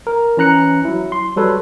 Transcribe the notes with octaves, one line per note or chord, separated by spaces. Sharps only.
A#4
E3 C#4 A#5 F#6 C#7
F#3 E4
C6
F#3 G3 A4 B4 C#5